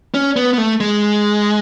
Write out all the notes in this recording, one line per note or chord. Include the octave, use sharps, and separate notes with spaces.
C#4
B3
B3
A3
G#3